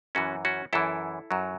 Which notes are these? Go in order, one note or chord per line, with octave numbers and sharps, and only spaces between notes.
F#2 E3 C#4 F#4
C#4 F#4
F#2 E3 E4 A4
F#2 F#3